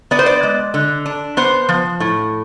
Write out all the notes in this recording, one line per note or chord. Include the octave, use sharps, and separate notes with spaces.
B3 D5
C5
D5
G#3
D3
D4
B3 C5
F3
A2